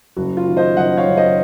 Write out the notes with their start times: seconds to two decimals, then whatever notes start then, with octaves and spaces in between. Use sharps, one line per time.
0.16 F#1 F#4
0.37 F4
0.47 D#3
0.57 C5 D#5
0.77 F#1 D#5 F#5
0.97 C#5 F5
1.07 F#1
1.17 C5 D#5